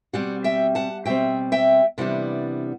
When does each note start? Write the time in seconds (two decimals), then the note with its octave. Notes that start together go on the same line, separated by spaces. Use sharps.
0.13 B2 G3 C4 D5 F#5
0.44 E5 G5
0.75 F#5 A5
1.05 B2 G3 C4 E5 G5
1.52 E5 G5
1.98 C3 E3 G3 B3 D4 D5 F#5